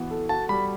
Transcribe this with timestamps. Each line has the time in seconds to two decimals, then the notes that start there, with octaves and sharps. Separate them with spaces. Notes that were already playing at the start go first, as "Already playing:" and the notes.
Already playing: E3 B3 F#4
0.10 A4
0.29 F#4 A5
0.49 G3 B5